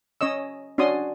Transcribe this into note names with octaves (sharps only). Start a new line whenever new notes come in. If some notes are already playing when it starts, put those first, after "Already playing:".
C#4 C#5 D#5 E6
C#4 D4 F#4 C6 D#6